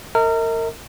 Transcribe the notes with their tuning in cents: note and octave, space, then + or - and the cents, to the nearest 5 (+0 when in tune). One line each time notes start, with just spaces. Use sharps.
A#4 -30 D#5 +45